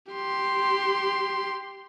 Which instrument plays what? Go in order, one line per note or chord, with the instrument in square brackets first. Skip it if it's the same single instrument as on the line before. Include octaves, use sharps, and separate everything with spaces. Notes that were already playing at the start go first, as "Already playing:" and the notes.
[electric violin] G4 C6